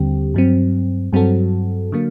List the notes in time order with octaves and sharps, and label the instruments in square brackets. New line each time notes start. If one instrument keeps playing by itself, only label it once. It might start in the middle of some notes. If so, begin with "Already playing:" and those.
Already playing: [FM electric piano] D#2 D3 G3 C4 G4
G2 F#3 C4
G2 F#3 C4 F#4 A4
D3 F#3 A#3